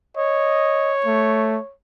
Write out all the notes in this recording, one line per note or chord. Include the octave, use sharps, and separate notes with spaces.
C#5 D#5
A3